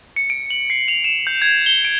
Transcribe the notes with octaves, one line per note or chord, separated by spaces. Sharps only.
C#7
D7
F#7
C7
F7
E7
G6
G#6
G7
D7